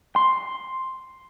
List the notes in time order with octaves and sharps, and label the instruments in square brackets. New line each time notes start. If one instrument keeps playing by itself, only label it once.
[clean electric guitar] C6